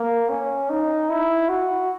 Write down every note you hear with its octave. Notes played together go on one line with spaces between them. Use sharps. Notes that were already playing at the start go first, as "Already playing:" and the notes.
Already playing: A#3
C#4
D#4
E4
F#4